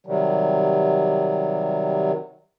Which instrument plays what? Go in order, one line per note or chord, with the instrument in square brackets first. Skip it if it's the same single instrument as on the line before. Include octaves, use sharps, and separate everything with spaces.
[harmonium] C3 D#3 F#3 G3